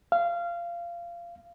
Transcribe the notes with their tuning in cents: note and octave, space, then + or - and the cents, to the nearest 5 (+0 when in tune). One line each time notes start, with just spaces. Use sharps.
F5 -20